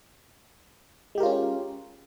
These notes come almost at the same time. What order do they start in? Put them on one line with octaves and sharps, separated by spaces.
G#3 G4 A#4 F4 C#4